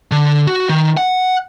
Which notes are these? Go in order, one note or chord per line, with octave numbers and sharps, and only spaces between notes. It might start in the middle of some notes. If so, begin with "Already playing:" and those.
D3
F#4
D#3
F#5